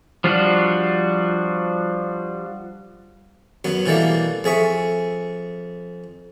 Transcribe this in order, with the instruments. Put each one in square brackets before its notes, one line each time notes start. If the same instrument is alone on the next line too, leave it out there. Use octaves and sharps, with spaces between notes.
[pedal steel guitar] F3 G3 D4 F4 F#4
[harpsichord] F#2 F#3 B3
B2 E3 G3 A3 A#3
F2 G#4 E5 C#6